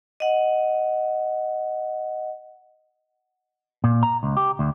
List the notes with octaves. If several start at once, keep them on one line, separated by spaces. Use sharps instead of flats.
D#5 F#5
A#2
A#5
C#2
G4
D2